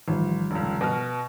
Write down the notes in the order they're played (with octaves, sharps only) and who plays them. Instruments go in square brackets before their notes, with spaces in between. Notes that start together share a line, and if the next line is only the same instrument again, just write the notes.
[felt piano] A1 [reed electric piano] D#3 F3 G3
[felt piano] F1 C#2
B2 F#4 F6